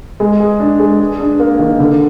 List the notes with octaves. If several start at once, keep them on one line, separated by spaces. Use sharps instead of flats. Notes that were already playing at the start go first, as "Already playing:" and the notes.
G#3
G#4
D4
G#3
G#4
D4
A#3
D#3
D3